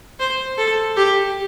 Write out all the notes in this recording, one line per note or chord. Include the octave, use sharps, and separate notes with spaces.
C5
A4
G4